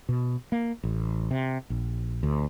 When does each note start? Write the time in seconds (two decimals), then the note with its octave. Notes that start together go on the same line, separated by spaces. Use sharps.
0.09 B2
0.52 A#3
0.83 A1
1.31 C3
1.70 A#1
2.23 D2